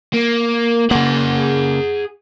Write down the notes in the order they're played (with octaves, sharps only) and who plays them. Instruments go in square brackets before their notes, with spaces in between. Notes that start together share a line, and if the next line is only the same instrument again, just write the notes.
[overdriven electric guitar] A#3
[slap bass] C#3 A#3 [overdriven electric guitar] G#4 F#5